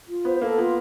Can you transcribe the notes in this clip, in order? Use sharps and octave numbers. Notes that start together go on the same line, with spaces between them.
F4
B3 C5
A#3 A4
B3 F4